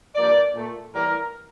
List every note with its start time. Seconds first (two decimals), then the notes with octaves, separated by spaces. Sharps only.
0.15 G2 F3 A#3 D5
0.54 A#2 A3
0.93 A2 E3 G3 A#3 A#4